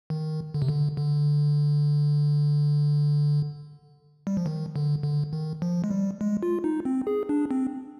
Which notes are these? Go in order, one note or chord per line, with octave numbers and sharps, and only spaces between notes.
D#3
D3
C3
D3
D3
G3
F3
D#3
D3
D3
D#3
F3
G#3
G3
G#3
F4
D#4
C4
G#4
D4
C4